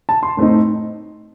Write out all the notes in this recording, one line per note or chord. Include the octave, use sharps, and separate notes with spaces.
A5
C6
A2 A3 C4 D#4